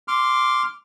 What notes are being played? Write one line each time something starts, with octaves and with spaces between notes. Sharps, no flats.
C6 D6 F6